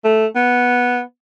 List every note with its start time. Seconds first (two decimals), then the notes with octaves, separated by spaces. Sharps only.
0.04 A3
0.36 B3